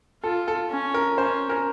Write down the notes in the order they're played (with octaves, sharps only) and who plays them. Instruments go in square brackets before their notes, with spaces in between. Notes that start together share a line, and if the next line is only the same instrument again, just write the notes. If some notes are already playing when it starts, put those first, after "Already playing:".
[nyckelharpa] F4 [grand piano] A4
[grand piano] A4
[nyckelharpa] C#4
[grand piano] A#4
[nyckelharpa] C#4 [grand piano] C5
[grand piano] A#4